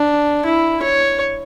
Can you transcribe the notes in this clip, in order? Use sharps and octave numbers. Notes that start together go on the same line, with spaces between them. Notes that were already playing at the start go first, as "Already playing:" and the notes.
Already playing: D4
E4
C#5